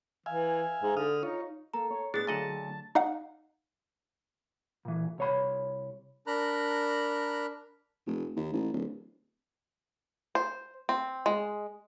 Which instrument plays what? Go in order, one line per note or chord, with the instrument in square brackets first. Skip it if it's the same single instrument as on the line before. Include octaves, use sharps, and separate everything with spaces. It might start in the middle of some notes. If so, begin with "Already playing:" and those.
[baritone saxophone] E3 [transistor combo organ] E5 F5 G#5
[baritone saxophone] G#2
[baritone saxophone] D3 [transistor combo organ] D#6 F6
[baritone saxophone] D#4 [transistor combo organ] F4 C#5
[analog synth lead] A#3 [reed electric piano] A4 [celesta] A#5
[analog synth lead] C#5
[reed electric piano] A2 D#4 E6 [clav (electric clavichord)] B3 D4 [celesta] G#4 [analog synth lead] A6
[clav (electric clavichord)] A#2 D#5 F#5 [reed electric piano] D3 F#3 A3 [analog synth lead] A5
[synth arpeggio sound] D#4 D#5 F5 F#5
[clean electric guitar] A#2 E3
C2 C#5 B5
[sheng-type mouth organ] D4 A#4 A#5 B5 F#6
[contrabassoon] F1
D#2
A1
D1
[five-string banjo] C5
C4
G#3